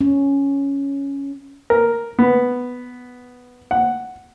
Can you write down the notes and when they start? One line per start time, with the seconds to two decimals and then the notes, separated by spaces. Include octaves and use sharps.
0.01 C#4
1.70 A#4
2.19 B3
3.71 F#5